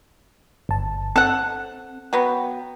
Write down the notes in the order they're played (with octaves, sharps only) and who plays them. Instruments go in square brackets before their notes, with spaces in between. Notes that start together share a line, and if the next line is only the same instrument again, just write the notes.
[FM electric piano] G1 A5
[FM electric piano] C4 [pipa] A4 F#5
[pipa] F#3 B3 [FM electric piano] G5